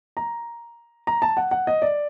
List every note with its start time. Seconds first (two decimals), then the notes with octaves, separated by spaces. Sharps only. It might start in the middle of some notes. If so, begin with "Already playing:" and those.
0.17 A#5
1.07 A#5
1.22 A5
1.37 F#5
1.51 F#5
1.67 D#5
1.82 D5